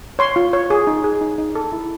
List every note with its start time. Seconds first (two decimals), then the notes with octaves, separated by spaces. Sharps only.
0.19 C#5 C6
0.36 F4
0.53 C#5
0.70 G#4
0.87 D#4
1.04 G#4
1.21 D#4
1.38 D#4
1.55 A4
1.72 E4